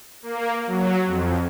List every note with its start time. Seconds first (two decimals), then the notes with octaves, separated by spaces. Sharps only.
0.23 A#3
0.67 F#3
1.06 F2